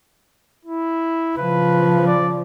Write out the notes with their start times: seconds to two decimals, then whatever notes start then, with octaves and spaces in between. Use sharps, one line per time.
0.65 E4
1.37 C#3 F3 B4
2.07 D5